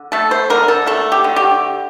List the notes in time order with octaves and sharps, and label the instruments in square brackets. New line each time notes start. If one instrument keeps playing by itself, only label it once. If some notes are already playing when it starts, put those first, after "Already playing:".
Already playing: [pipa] D3
A3 A4
C5
D3 A#4
A4
A3 A4
G4
D3
G4